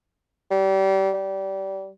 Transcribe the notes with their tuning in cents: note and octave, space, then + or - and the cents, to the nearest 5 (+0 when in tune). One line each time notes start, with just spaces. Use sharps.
G3 -30
G3 -25